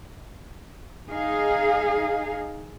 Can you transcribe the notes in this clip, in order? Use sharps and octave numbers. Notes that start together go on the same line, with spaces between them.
D#4 G#4 F5